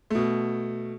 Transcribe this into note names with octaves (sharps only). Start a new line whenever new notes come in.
B2 A3